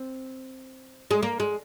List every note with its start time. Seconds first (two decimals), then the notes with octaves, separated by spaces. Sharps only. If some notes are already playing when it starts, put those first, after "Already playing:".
Already playing: C4
1.11 G#3
1.23 A#3
1.40 G#3